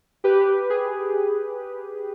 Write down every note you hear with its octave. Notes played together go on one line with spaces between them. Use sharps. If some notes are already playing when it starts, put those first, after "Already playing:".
G4 B4
G#4